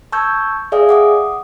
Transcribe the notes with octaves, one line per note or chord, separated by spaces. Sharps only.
A5 C#6 E6 G6 G#6
G#4 D5 E5 F5 G#5 D#6
F#5 D6 D#6